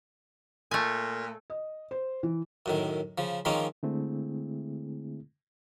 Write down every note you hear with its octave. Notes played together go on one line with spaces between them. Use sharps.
A#2 A3 G#5
D#5
C5
E3
F#2 A2 D#3
C#3 F3
D#3 F3 G#3 A#3 C4 C#4
D3 G#3 A3 C4 E4 G#4